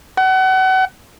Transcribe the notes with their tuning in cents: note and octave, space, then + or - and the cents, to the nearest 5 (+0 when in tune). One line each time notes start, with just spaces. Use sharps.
F#5 +30